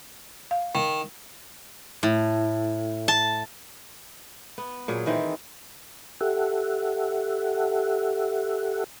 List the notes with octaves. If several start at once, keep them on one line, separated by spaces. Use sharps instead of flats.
F5
D#3
A2
A5
B3
A#2 F#3 G#4
D#3 E3 C4 G#4
G4 A4 E5 F#5